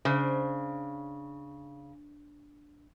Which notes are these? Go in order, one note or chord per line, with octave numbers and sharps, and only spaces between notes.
C#3 D4 C5